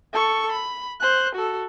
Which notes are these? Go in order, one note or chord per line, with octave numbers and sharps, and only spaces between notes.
A4 C#6
B5
C5 F#6
F#4 A4